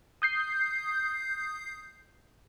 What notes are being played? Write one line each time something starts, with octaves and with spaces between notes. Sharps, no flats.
D#6 G6 C7